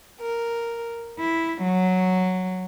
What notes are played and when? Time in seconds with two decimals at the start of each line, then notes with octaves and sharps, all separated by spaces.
0.20 A#4
1.18 E4
1.62 F#3